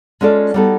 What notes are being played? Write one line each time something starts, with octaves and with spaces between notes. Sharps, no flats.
G#3 C#4 F4 A4 D5
G3 B3 D#4 F#4 A4